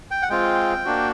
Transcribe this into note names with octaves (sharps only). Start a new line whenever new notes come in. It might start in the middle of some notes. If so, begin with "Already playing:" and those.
G5
F#5
G#3 C4 F4 G5
A#3 D4 F#4